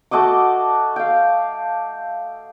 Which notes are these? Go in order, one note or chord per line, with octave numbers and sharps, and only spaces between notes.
A3 F#4 D#5 D6
F5 G5